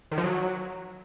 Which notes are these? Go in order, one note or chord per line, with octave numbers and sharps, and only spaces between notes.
D#3
F3
F#3